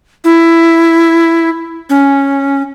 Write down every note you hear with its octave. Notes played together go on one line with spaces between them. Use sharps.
E4
C#4